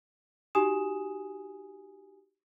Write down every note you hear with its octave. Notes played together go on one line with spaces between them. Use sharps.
D#4 F#4 G4 G#5 D#6 E7